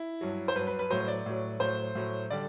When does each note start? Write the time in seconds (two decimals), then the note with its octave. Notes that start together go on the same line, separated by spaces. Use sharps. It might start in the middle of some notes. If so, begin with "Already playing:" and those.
Already playing: E4
0.21 G2 F#3
0.48 C5
0.55 G2 F#3 B4
0.67 B4
0.79 B4
0.90 A2 F#3 C5
1.08 D5
1.26 A2 F#3
1.60 A2 F#3 C5
1.95 A2 F#3
2.30 D3 G3 D5